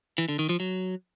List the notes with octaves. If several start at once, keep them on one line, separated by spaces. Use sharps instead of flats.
E3
D3
D#3
F3
F#3